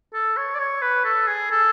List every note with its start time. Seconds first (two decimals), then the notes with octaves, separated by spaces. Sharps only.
0.14 A4
0.37 C#5
0.55 D5
0.59 C#5
0.82 B4
1.05 A4
1.27 G#4
1.51 A4